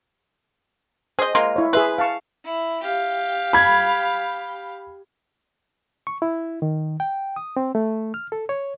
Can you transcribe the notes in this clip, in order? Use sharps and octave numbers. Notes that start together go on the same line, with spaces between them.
G#4 C5 D#5
G#3 A#3 F4 A#5
E4 C#5
G#4 B4 E5 C6
F5 A5 C#6
E4
G4 F5
B5 G#6
C#6
E4
D#3
G5
D#6
C4
A3
F6
A4
C#5